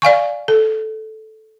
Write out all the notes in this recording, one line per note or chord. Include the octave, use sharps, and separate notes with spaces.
D5 F5 G#5 C#6
A4